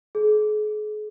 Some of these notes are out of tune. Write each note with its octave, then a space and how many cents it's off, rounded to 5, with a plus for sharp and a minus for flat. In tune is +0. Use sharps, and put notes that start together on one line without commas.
G#4 +40